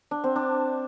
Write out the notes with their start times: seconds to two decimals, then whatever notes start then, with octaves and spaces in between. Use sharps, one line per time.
0.11 D4
0.24 C4
0.36 D4